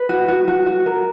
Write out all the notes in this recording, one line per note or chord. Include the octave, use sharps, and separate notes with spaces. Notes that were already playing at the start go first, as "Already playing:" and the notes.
Already playing: B4
F#4
F#4
F#4
F#4
A#4